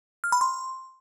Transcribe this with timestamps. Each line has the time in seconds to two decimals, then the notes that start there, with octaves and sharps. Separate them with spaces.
0.24 F6
0.32 B5
0.41 C6